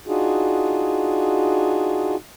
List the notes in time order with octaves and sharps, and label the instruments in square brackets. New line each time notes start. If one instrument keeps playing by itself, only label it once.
[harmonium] D4 D#4 F4 F#4 G#4